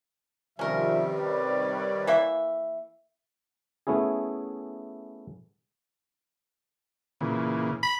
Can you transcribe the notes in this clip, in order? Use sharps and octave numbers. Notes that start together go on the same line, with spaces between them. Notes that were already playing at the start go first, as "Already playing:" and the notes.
C3 D#3 F3 G3 C#4 A#4 E5
B4 C#5 D5
E3 A#3 E5
A3 B3 C#4 E4 G#4
A#2 C#3 E3
B5